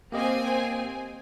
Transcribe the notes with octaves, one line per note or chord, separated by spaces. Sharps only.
A#3 C4 G4 D#5 G#5